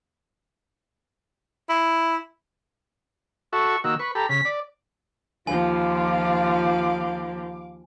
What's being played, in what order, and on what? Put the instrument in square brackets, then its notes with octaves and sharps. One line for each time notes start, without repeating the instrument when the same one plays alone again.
[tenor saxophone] E4
[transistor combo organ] F#4 A4 E5 [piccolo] C#6
[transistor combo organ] D#3 A#3 F#4 [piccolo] E6
[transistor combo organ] B4 C#6 [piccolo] B5
[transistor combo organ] G4 A4 B5 [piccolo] A#5
[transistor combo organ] C#3 [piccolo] B6
[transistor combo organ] D5
[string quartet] D#2 F3 [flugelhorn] F4 [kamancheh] F5 D6 [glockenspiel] G#5